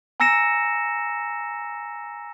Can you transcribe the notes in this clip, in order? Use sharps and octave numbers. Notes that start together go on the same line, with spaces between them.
G#5 A#5 E6 A#6 C#7 E7